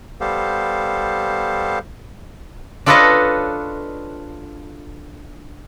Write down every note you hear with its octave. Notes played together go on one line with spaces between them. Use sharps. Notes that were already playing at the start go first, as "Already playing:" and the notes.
G3 B3 G4 A4 C5 F5
D4 F4 A4 B4 C#5 D#5